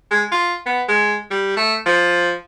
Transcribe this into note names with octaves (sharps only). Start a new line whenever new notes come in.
G#3
F4
B3
G#3
G3
A3
F3